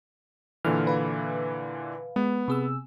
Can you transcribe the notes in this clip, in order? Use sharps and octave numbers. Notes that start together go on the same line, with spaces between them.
A#2 D3 E3 F6
B4 F5
G#3 B3
C3 G#4 E6